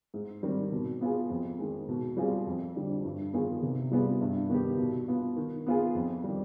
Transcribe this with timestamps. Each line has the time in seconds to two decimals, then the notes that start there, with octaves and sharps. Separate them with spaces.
0.14 G#2
0.43 D#3 G3 C4
0.72 B2
1.01 B3 F4 G#4
1.30 F2
1.59 D#3 G#3
1.89 B2
2.17 G3 C4 F4 G#4
2.47 F2
2.76 D3 G3
3.05 G2
3.33 D#3 B3 F4 G#4
3.63 C3
3.91 G3 B3 F4 G#4
4.21 G2
4.49 D#3 B3 D#4 G4
4.78 B2
5.08 B3 F4
5.36 D#3
5.66 B3 F4 G#4
5.95 F2
6.24 D#3 G3